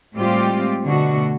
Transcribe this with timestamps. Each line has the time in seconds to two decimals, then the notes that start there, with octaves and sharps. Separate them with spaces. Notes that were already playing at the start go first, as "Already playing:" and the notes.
0.15 A2 G3 G#3 C4 F4 G4
0.84 B2 D3 A3 F#4